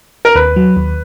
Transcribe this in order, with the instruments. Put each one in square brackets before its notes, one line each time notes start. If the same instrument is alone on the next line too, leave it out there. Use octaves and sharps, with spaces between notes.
[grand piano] A#4
[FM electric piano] D#2 [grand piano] B4
[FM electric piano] F#3
D#2